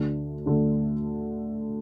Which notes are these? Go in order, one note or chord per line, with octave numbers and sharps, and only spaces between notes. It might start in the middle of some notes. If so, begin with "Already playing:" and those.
Already playing: D2 D3 A3 D4
D2 D3 A3 D4